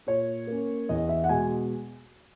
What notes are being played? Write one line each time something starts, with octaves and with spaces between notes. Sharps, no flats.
A#2 C#5
A#3 C#4
E2 D#5
E5
F#5
B2 G#3 G#5